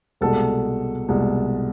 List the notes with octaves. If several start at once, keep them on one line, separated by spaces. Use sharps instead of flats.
C2 B2 G#3 A4
C2 B2 G#3